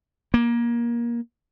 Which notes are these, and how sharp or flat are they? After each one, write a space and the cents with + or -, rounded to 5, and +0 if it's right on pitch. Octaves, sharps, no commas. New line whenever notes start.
A#3 +20